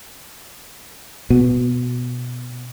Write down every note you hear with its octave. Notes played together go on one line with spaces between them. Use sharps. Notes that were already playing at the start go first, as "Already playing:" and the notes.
B2